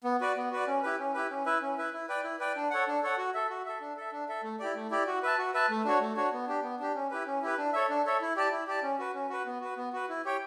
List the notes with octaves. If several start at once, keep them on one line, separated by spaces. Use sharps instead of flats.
B3
F#4 B4 D5
B3
F#4 B4 D5
C#4
E4 G4 B4
C#4
E4 G4 B4
C#4
E4 B4 E5
C#4
E4 B4 E5
E4
B4 D5 G5
E4
B4 D5 G5
D4
A4 C#5 F#5
D4
A4 C#5 F#5
F#4
A4 E5
F#4
A4 E5
D4
A4 E5
D4
A4 E5
A3
E4 G4 D5
A3
E4 G4 D5
F#4
B4 E5 A5
F#4
B4 E5 A5
A3
D4 F#4 C#5
A3
D4 F#4 C#5
B3
D4 G4
B3
D4 G4
C#4
E4 G4 B4
C#4
E4 G4 B4
D4
A4 C#5 E5
D4
A4 C#5 E5
E4
G4 D5 A5
E4
G4 D5 A5
C#4
F#4 B4
C#4
F#4 B4
B3
F#4 B4
B3
F#4 B4
E4
G4 C#5 G5